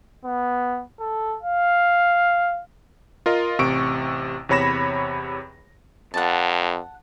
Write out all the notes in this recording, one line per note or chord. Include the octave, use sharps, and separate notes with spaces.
B3
A4
F5
F4 A#4 D#5
A1 C3 C#6 D7
E2 C3 C#5 B5 A#6 E7
F2 F#5 A5